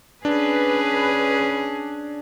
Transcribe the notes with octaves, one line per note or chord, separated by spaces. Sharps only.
C#4 D4 G#4 B4